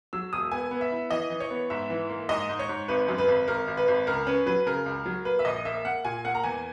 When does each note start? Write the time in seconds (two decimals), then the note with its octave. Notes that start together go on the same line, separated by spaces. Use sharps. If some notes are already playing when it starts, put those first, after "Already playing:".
0.13 F#3 E6
0.32 E1 D#6
0.52 B3 G#5
0.71 B3
0.81 E5
0.92 E4
1.11 E3 D#5
1.30 E3
1.40 C#5
1.50 B3
1.70 G#2 E5
1.90 E3
2.10 A#3
2.29 G#2 D#5
2.49 G#2
2.59 C#5
2.69 G#2
2.88 G#1 B4
3.08 F#2
3.18 B4
3.28 G#1
3.48 G#1 A#4
3.68 G#1
3.77 B4
3.88 G#1
4.07 C#2 A#4
4.27 C#4 B4
4.46 F#3 B4
4.66 C#3 A#4
4.86 C#2
5.06 F#3
5.25 A#3 B4
5.39 E5
5.45 A#1 D#5
5.65 A#3 E5
5.85 A#3 F#5
6.05 A#2 G#5
6.25 A#3 F#5
6.35 A#5
6.44 E2 G#5